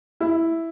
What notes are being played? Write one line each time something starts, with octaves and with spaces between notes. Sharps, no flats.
E4